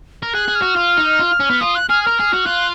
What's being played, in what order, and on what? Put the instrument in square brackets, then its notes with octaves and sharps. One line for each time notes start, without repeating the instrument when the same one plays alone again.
[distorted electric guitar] A#4
[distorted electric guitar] G#4 [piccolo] F#6
[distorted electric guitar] G#4
[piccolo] F6
[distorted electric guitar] F#4
F4
D#4
F4
C#4
B3
[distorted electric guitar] F4 [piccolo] D#6
[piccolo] F#6
[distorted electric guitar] G#4 [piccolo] F6
[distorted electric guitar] A#4 [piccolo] F6
[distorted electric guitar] G#4
F#4
[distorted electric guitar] F4 [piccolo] F#6